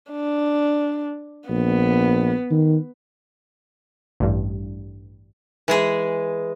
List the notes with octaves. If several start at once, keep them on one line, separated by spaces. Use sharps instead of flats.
D4
A#1 B3
D#3
A1 G2
E3 G#3 G#4